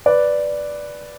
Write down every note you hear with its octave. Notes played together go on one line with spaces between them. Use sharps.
B4 D5